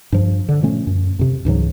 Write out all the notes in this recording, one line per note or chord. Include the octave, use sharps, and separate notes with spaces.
G2 F3
D3
A#2 F3 A3 C#4
F#2
F2 C3
C#2 G#2 E3 F#3